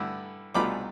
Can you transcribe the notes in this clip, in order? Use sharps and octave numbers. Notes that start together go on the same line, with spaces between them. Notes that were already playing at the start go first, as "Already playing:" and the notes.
Already playing: G2 D3 A3 E4
C2 B2 A3 D4 F4 B5 D6